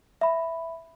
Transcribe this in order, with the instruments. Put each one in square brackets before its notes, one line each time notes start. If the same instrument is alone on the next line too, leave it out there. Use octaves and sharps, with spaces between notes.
[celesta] E5 B5